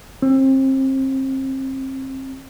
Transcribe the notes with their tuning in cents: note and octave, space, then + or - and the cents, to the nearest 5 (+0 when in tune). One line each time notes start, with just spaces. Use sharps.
C4 +30